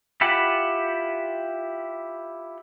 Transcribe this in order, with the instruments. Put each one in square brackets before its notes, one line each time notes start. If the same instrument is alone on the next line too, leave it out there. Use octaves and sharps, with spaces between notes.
[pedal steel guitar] E4 F4 G4 F#5 B5